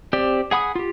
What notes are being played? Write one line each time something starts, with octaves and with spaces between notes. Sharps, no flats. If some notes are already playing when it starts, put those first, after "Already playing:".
C4 G4 D5
G#4 F#5 B5 D#6
F4 G4